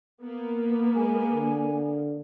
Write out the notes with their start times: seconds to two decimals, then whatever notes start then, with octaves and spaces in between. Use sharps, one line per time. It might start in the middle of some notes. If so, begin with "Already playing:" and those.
0.21 A#3 B3
0.96 G#3 G#5
1.33 D3